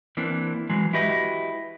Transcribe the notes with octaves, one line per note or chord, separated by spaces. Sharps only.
E3 A#3 C4 D4
E3 F#3 G#3
E4 F#4 G4 B4 D#5 E5